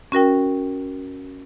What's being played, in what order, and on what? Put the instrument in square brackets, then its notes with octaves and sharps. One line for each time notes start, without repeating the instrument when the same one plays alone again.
[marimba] C#4 F#4 A#4 G5